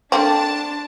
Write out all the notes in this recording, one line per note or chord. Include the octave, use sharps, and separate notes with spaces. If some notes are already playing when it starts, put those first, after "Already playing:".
A3 A#3 C4 D4 A5